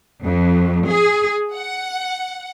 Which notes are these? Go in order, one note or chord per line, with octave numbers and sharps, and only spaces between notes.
F2
G#4
F#5